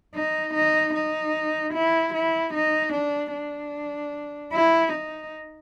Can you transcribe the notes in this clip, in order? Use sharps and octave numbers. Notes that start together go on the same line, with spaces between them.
D#4
D#4
D#4
E4
E4
D#4
D4
D4
E4
D#4